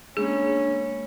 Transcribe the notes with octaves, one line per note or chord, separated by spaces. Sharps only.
G#3 A#3 B3 C#4 D4 G#4